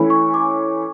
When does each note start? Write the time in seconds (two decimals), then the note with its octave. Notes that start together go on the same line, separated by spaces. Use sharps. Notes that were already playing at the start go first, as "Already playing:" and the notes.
Already playing: E3 A3 C#4 E4 B5
0.10 C#6
0.34 D6